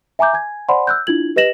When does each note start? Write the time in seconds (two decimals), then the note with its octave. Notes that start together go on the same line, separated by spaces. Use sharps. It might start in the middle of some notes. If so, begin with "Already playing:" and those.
0.19 E5 G#5 A#5 D6 G6
0.34 G#5 G#6
0.69 C5 D5 F#5 G#5 B5 C6
0.87 E6 F#6 G6
1.07 D4 E4 F4 G#6 F#7
1.36 G4 B4 D#5 A#6 E7 F#7